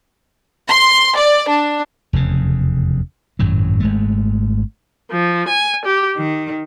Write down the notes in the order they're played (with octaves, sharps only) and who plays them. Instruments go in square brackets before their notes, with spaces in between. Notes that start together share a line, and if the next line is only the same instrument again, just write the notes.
[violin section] C6
D5
D4
[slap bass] F1 E2 C#3
G#1 F#2 A2 F#3
G#1 G#3 A3
[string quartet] F3
G#5
G4
D#3